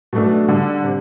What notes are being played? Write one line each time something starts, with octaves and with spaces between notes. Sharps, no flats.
B2 F#3 A3 D4 A4
D3 G3 D4
C3